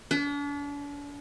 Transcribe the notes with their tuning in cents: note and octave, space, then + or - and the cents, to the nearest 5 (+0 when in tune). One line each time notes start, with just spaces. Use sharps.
D4 -40